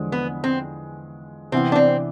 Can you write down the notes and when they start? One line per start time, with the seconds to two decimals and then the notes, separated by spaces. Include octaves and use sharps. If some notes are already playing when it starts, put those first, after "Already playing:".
Already playing: E2 D3 F3 G#3
0.12 B3
0.44 C4
1.52 C3 E3 B3 C4
1.72 D4
1.76 C4